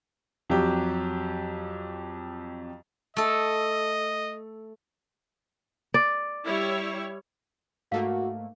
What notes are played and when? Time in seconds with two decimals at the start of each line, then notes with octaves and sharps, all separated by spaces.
0.50 F2 F#3 G4
3.16 A3 A4 D#5
5.94 D5
6.45 G3 E4 C#5
7.92 G#2 A3 A#3 F#4 F5